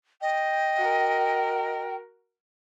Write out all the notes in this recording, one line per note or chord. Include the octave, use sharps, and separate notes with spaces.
D#5 G5
F#4 A#4